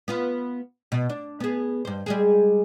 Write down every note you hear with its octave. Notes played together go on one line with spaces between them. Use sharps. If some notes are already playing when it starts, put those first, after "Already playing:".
B3 F4 B4
B2
D4
B3 G#4
G2 C5
G3 G#3 G#4